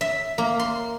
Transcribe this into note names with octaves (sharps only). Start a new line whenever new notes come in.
E5
A#3
C6